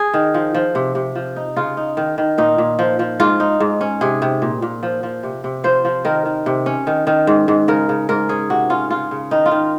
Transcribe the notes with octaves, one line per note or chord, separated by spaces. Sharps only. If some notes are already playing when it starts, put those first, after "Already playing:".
Already playing: G#4
D#3
F3
F3
C3
C3
F3
D#4
C#3 F4
D#4
D#3
D#3
A#2 D#4
A#2
F3
F3
G#2 F4
D#4
G#2
C#4
C3 G#4
C3
A#2
A#2
F3
F3
C3
C3
F3 C5
F3
D#3 A#4
D#3
C3
C#4
D#3
D#3
G#2
G#2
C#3 A#4
C#3
G#2 A#4
C#4 G#4
C3 F#4
C#4 F4
C#3 F4
C#3
D#3 D#4
F4
D#3